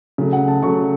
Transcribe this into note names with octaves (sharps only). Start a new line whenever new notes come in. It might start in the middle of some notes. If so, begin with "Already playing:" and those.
C#3 F#3 A3
F#5
A5
C#3 F#3 A3 C#6